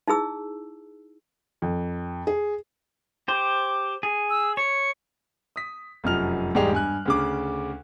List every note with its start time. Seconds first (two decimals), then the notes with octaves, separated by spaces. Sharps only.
0.08 D#4 E4 G#4 E6
1.62 F2
2.27 G#4
3.28 G4 C5 D6
4.03 G#4
4.30 E6
4.57 C#5 C#7
5.56 D#6 B6
6.04 F1 F#2 F3 F6 F7
6.54 E1 G#2 G3 G4 G#4 F7
6.73 G2 G#5 F#6
7.06 D2 C#3 D6